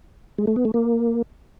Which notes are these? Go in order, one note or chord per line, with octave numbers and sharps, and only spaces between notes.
G#3
A3
B3
A3
A#3